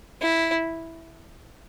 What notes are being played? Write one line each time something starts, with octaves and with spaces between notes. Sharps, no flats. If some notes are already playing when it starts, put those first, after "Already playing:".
E4